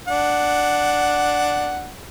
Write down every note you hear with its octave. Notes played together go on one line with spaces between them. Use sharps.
D4 F#5